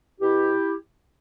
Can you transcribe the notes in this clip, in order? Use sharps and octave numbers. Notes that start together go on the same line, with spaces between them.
B2 E4 G4